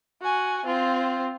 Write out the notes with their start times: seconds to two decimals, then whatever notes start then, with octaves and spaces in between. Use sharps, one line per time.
0.21 F#4 G#5
0.65 C4 F4